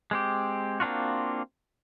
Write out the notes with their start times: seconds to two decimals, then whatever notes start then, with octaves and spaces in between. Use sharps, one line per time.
0.11 G#3 C4 G4
0.80 A#3 C4 D4 F4 F#4